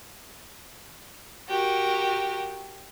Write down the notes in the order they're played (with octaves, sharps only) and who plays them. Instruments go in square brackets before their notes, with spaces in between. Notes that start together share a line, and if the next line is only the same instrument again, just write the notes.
[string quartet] F#4 G4 A#4